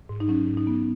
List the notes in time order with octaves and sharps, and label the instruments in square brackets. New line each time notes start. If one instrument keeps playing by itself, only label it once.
[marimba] G#2
D#4
F#3 C#4
G#2
D#4
B3